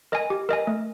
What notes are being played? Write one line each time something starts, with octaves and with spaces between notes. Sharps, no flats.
A#4 D#5 G#5
G4
A#4 D#5 G#5
A3